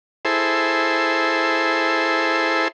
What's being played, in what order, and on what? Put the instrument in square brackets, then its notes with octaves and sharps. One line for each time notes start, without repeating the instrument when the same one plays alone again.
[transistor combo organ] E4 G#4 A4 C5